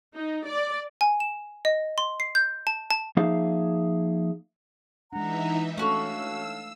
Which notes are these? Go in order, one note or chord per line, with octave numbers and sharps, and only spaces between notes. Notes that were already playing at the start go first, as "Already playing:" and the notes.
D#4
D5
G#5
E7
D#5
C6
C7
G6
A5
A5
F3 A#3 D#4 G#4 E5 F5
E3 G#3 D4 D#4 E5 F#5 A#5
A3 C#4 D4 F#4 A4 C#5 F5 E6